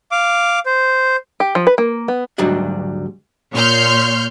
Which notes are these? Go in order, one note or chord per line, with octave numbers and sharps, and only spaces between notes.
F5 D6
C5
G4
F3
B4
A#3
B3
D2 G#2 F#3 G3 D4
A#2 C#5 C6 F6 G6